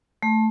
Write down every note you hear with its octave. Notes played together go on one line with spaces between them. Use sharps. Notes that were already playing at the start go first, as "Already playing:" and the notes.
A3